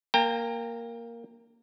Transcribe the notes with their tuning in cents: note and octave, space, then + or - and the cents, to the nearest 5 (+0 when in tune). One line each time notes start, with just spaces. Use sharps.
A#3 +0 G5 +25 A#5 -25